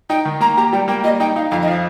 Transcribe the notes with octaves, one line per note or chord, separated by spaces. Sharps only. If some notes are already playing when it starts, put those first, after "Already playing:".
D#4 G5
D#3
A#3 A#5
G4 A#5
G3 G5
A#3 G5
G3 D#5
D#4 G5
D#4 F5
F2 F5
D#5
F3 F5